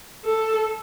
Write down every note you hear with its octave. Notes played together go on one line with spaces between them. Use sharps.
A4